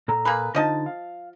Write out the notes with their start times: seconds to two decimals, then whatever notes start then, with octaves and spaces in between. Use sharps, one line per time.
0.08 A#2 A4 A#5
0.25 A#3 G#4 B4
0.55 D3 F3 D#4 D#5 A5
0.86 F5